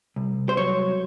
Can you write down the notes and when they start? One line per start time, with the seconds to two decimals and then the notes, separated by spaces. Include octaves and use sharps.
0.16 C2
0.49 C5
0.57 F#3 C#5